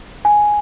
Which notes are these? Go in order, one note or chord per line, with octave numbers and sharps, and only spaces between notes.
G#5